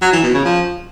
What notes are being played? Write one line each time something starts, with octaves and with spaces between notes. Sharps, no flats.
F#3
E3
B2
C#3
F3